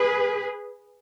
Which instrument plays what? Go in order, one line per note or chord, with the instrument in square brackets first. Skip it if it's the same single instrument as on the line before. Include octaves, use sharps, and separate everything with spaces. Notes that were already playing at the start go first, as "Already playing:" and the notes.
Already playing: [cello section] G#4 B4